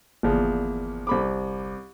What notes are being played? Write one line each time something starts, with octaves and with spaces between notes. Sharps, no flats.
G1 E2 A#2 F3
C2 B5 D6